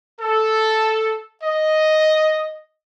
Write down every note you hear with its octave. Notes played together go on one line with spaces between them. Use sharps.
A4
D#5